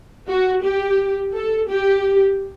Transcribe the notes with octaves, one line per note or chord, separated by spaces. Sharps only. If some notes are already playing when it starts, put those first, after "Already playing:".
F#4
G4
A4
G4